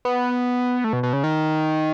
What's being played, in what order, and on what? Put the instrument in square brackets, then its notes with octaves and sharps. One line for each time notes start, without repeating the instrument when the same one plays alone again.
[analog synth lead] B3
A3
B2
B2
C#3
D#3